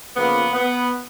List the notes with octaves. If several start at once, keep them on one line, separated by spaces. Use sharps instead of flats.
C#3 F3 A#3 B3
B3